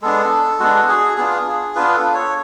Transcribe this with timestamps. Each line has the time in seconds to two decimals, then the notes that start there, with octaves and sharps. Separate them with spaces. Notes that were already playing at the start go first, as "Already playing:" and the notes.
0.02 G#3 B3 D4 A4
0.60 G#3 B3 D4 F#4
0.89 G#4
1.18 B3 D4 F4 G#4
1.75 B3 D4 F4 B4
1.95 A4
2.14 C#5